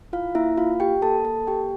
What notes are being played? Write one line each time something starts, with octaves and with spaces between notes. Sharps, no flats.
E4 F4 F5
A#3 E4 E5
A#3 F4 F5
G4 G5
A#3 A4 A5
A#3 A4 A5
A#3 G4 G5